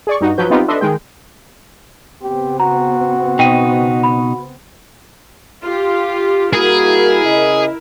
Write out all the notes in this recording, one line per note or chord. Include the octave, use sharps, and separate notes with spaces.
G#4 D5 C#6
G2 D#4 F#4
F3 F#3 B4 G6
B3 C4 D#4 F4 G4 B4
D4 A4 B4 D#5 E5 C6
D#3 G#3 G5
C#3 B3 C4 G4
F#4 A#5
B2 D#4 G5 D#7
B5
F4 G4
G3 A#3 E4 F#4 G#4 A#4
C#3 D#5